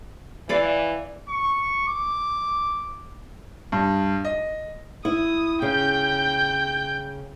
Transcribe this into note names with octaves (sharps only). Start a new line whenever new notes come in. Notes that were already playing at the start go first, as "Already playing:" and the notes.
E3 D5 F5 B5
C#6
D6
G2
D#5
E4 D#6
C#3 G5 G6